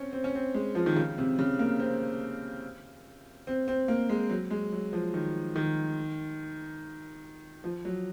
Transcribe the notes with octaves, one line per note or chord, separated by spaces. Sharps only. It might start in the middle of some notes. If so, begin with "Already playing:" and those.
Already playing: C4 C#4
C4
C#4
C4
G#3
F3
D#3
C#3
C3
C#3
A#3
C4
C4
C4
A#3
G#3
F#3
G#3
F#3
F3
D#3
D#3
F3
F#3